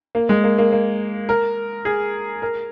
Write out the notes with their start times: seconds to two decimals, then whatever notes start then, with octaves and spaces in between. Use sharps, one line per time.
0.15 A#3
0.29 G#3
0.44 A#3
0.58 A#3
0.72 A#3
1.29 A#4
1.85 G#4
2.42 A#4